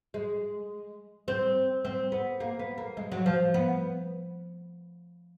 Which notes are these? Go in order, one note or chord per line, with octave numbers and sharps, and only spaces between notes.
G#3
C4
C4
B3
A#3
B3
A#3
G#3
F#3
F3
B3